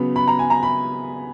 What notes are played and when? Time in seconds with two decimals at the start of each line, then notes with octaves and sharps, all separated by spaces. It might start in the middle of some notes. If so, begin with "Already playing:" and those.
Already playing: C#3 F#3 B3 B5
0.16 B5
0.27 A#5
0.39 G#5
0.50 A#5
0.63 B5